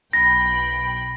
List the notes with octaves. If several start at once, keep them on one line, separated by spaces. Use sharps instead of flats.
B1 G5 B5 A#6